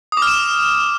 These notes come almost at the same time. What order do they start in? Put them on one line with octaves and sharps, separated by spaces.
D#6 D6 F6 E7